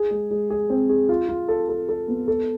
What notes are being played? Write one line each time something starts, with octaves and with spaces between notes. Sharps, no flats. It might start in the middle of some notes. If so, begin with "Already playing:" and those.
Already playing: G#4
G#3
G#3
G#4
C4
G#4
F4
F4
A4
A4
A4
B3
A4